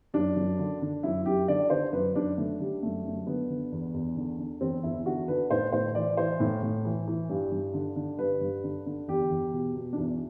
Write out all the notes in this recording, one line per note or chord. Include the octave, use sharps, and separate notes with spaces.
F#2 D4
F#2
D3
D3
F#2 E4
F#2 G4
D3 D5
D3 C5
F#2 B4
F#2 D4
D3 A3
D3 G3
F#2 A3
F#2
D3 B3
D3
E2
E2
D3
D3
E2 C4
E2 E4
D3 F#4
D3 B4
A2 C5
A2 C5
E3 D5
E3 C5
A2
A2
E3
E3
G2
G2
D3
D3
G2 B4
G2
D3
D3
E2 G4
E2
B2
B2
D4
E2 E4